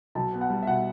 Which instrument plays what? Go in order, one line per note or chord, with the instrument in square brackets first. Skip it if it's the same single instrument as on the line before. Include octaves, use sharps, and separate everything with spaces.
[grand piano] B1 A5
B3
F#5
G3
E5
B2 F#5